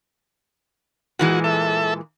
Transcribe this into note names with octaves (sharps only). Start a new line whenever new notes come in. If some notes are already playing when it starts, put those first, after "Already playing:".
A#2 E3 G#3 F#4
A4 E5